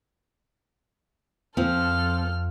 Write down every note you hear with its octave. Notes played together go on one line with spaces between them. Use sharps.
F2 F3 C4 A4 F6